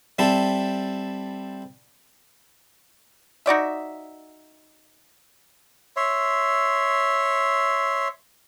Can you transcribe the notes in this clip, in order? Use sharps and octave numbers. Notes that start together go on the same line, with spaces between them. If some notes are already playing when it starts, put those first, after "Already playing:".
G3 C4 E4 A4
D#4 F#4 D5 E5
C#5 E5 C6